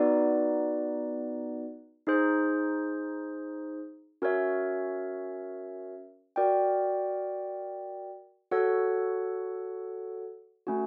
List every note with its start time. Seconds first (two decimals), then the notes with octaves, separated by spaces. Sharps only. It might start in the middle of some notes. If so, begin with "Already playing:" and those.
Already playing: B3 D#4 F#4 B4 D5
2.07 D#4 G#4 C5
4.22 C#4 F#4 A#4 C#5 E5
6.36 F#4 A#4 D5 G5
8.51 F#4 A4 C#5 F#5
10.67 A3 C#4 F#4